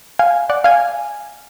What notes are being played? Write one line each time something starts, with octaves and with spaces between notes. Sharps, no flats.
F5 G#5
D5 F#5
F5 G#5